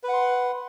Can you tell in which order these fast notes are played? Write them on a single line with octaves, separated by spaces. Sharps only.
B4 F#5 C6